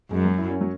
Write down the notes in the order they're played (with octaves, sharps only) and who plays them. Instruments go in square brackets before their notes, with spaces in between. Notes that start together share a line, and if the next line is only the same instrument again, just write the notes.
[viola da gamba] F#2 [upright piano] G#3
[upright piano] F#3
E4
C#4
F#3